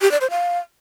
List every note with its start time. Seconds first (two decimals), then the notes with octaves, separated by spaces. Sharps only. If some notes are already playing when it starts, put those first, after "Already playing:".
0.02 G4
0.11 D5
0.21 C5
0.30 F5